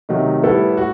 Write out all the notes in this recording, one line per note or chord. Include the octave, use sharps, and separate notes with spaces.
C3 D#3 F#3 A3 D#4
A2 G3 B3 E4 A4
F#4